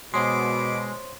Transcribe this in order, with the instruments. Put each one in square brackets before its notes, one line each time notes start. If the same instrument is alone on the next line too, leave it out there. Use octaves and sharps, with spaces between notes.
[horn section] B2 [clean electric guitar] G#3 [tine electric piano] C5 C#5 C6 [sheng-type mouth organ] D6